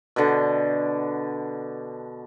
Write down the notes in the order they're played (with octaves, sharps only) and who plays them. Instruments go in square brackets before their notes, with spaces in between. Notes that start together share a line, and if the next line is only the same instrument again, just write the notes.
[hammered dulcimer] B2 D3